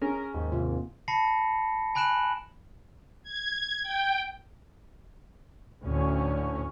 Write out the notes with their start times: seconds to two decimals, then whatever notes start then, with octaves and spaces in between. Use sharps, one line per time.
0.02 C#4 G#4 A#4
0.34 D#2 G#2
0.52 C3 F4
1.08 A5 B5 A#6 C7 C#7
1.95 G#5 B5 F#6 D7 E7 F#7
3.23 G#6
3.83 G5
5.82 D2 A2 C#4